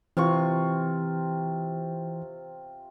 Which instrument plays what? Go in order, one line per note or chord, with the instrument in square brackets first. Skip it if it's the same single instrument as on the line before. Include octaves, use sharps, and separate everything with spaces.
[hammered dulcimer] C3 F4 C#6 [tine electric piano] E3